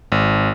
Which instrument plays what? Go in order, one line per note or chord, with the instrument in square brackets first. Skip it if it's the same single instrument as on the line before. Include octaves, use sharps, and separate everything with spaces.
[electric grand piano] G#1